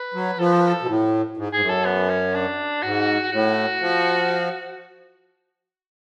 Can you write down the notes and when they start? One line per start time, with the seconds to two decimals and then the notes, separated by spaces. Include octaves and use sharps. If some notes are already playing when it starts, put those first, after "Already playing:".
Already playing: B4
0.14 F#3
0.38 F3 A4
0.46 B4
0.53 A4
0.60 B4
0.68 A4
0.82 B2
0.87 A2
1.37 G#2
1.53 G#2 G#4
1.60 F#2
1.69 A4
1.85 B3
2.09 C#4
2.34 D4
2.82 G#2 F#4
3.32 A2 F#4
3.80 F3